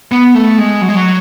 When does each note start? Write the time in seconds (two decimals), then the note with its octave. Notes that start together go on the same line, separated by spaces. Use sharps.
0.12 B3
0.35 A3
0.58 G#3
0.81 F#3
0.88 G#3
0.95 F#3